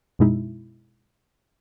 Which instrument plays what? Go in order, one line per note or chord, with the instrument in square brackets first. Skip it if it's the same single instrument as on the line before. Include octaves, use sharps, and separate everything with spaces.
[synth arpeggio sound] F#2 B2 G#3 D#4 E4